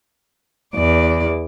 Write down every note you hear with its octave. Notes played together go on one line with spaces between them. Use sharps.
E2 D5